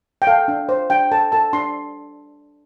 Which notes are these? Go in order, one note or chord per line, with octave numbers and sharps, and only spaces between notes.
G5
A4 F5
D4
C5
D4 G5
A4 A5
A4 A5
D4 C6